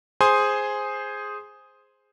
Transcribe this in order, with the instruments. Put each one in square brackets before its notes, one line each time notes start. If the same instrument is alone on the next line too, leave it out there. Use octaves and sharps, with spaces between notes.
[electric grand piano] G#4 C5 G#5 C6 D#6